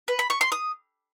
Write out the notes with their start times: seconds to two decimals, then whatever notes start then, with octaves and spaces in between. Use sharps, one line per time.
0.08 B4
0.19 B5
0.30 C#6
0.41 C6
0.52 D#6